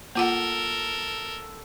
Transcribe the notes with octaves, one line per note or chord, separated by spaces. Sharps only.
A#3 F4 A4 A#4 F#5